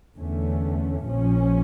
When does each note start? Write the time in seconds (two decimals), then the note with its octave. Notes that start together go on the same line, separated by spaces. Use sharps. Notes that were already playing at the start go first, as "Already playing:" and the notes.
0.16 E2 D3 A3 C#4
1.04 A#1 A#2 F3 C#4